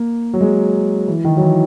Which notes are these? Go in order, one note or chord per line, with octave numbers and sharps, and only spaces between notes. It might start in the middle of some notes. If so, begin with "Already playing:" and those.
Already playing: A#3
F#3
G#3
E3
D#3
F#3
E3